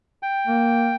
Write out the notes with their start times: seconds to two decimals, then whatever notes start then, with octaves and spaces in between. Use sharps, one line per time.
0.23 G5
0.47 A#3